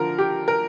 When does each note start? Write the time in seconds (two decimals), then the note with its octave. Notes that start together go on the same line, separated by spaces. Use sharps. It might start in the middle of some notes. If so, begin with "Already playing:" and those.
Already playing: D3 F3 A#4
0.18 G4
0.48 A#4